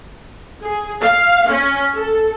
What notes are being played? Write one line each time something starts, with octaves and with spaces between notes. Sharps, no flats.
G#4
F5
C#4
A4